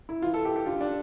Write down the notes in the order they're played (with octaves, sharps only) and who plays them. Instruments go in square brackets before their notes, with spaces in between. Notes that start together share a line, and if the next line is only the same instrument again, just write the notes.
[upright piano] E4
[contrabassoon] E3 [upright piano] F4
[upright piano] A4
G4
G4
[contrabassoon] D3 [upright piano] F4
[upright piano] D4